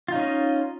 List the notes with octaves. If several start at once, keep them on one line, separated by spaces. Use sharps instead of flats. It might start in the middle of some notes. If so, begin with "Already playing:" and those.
C#4 D#4 F4 D#5